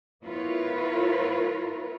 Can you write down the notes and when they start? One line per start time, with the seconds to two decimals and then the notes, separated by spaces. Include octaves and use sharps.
0.24 B3 E4 F4 A#4 B4 C#5